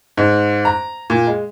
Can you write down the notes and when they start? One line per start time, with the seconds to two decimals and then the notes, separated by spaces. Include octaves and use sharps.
0.17 G#2
0.65 A#5
1.10 A#2
1.27 G#3